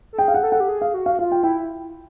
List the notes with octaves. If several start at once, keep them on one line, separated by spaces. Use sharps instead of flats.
A4
G#4 G5
F5
F#5
A4
F#5
G4
G#4
F5
F#4
F5
F#4
F4 F5
G5
E4 G5